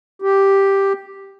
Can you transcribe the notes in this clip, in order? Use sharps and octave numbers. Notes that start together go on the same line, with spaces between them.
G4